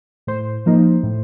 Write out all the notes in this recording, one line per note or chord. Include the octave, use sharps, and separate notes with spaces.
A2 C5
F3 A#3 D#4
A2